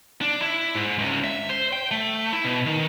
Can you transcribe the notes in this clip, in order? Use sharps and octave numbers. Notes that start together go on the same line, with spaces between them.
D4
E4
G#2
C#2
E5
C5
G5
A3
E4
B2
D#3